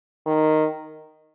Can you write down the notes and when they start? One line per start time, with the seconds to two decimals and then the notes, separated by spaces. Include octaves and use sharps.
0.26 D#3